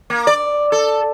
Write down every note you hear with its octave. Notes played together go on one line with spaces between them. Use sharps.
A#3
D5
A4